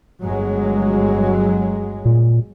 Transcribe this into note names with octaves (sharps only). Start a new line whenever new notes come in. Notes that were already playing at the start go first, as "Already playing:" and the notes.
G1 F#3 G#3
A#2